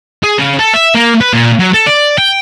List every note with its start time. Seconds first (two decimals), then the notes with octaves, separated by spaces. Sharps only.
0.24 G#4
0.39 C#3
0.59 A4
0.74 E5
0.95 A#3
1.21 B4
1.33 A#2
1.59 F#3
1.74 A4
1.86 D5
2.18 G5